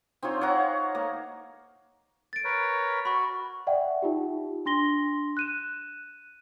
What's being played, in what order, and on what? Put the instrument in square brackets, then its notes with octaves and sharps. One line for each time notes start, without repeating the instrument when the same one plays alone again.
[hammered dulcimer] C4 D#4 F4 C#5
C#5 F5 F#5 A#5
A#3
[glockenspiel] A6 D7
[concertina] A#4 B4 C#5
[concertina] F#4 [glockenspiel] B5 C#6
[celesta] D5 E5 F#5 G5
D#4 F4 G4
D4 C6 A#6 G7
F#6 D#7 E7